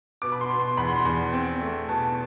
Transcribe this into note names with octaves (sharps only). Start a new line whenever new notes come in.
B2 D6
B5
C6
B2
C6
E2 B5
C6
B5
E2
C4
A3
B2 A5